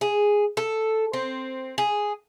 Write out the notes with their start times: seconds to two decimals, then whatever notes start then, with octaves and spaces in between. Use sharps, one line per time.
0.01 G#4
0.57 A4
1.13 C4
1.78 G#4